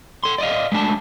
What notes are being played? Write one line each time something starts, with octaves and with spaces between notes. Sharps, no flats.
A4 C6
D5 D#5 F5
G#3 A3 D4 A5